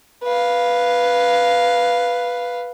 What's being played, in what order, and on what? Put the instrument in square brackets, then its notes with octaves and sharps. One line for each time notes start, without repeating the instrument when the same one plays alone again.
[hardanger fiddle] B4 F5